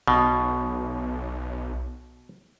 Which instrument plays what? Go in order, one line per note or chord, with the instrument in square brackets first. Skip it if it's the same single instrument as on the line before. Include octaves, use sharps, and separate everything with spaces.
[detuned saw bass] B1 [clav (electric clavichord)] B2